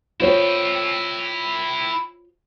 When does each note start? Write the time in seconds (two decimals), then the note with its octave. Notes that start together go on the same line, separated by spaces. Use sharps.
0.20 E4 F4 C5 C#5 G5